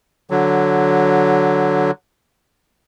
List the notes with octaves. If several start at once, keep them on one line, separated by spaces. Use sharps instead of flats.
D3 F#3